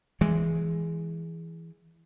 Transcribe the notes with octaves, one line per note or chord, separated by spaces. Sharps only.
E3 G#3